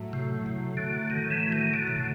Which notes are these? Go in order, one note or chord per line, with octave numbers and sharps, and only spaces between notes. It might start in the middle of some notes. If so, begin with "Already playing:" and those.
Already playing: A2 F#3 A3
C3
C3
D3
D#3
E3
D#3
D3
B2
C3